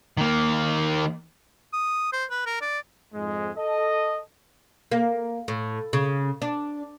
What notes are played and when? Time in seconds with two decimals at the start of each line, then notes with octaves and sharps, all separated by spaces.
0.18 D#3 A#3
1.73 D#6
2.13 C5
2.30 B4
2.46 A#4
2.61 D5
3.14 F2 G#2 G#3
3.56 A4 D#5
4.92 A#3
5.48 A2
5.93 C#3
6.42 D4